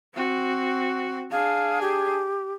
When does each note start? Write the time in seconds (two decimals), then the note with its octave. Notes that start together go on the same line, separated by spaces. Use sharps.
0.15 C4 F#4
1.32 D4 G#4 F5
1.82 G4